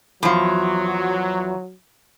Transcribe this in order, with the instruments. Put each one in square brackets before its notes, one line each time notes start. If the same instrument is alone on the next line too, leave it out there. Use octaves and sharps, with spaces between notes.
[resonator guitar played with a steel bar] E2 F3 [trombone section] F#3